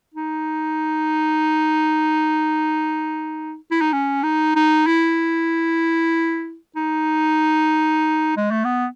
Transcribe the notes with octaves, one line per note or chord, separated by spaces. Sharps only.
D#4
E4
D#4
C#4
D#4
D#4
E4
D#4
G#3
A3
B3